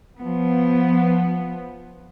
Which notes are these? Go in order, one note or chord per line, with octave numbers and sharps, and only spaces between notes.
F3 B3